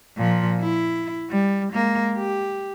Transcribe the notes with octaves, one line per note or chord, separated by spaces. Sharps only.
A#2 F3
E4
G3
G#3 A#3
G4